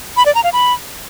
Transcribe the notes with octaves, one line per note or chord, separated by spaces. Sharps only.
B5
D5
A#5
F5
B5